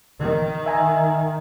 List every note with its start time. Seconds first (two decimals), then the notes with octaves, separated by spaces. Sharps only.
0.19 D#3
0.66 E5 G#5 A#5